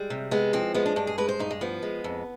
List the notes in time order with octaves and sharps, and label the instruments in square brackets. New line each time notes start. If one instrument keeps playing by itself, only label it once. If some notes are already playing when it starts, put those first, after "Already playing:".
Already playing: [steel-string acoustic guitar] G3 G#3
C3
G#3 B3
F3 C4
G#3 B3
D4
G2 D4
G#4
G#3 B4
C5
G2 D#4
G#3
F3 B3
G#3
F2